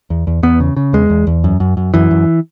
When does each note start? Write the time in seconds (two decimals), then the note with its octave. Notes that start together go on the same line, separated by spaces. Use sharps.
0.10 E2
0.27 E2
0.43 E2 B3
0.60 C#3
0.77 C#3
0.93 E2 G#3
1.10 E2
1.27 E2
1.44 F#2
1.60 F#2
1.77 F#2
1.94 F#2 E3
2.11 F#2